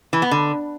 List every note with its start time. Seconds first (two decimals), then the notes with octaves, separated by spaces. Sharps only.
0.13 E3
0.22 B3
0.31 D3